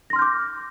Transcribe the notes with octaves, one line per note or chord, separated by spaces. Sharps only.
C6 D6 F6 G6 A#6